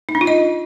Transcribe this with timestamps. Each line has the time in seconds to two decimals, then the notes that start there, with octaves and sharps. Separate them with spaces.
0.09 D#4
0.15 D4
0.21 F4
0.27 D#5